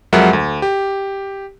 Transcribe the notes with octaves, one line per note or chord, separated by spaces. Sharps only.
F2 F#3 G#3 A#4 E5 F#5
D2
G4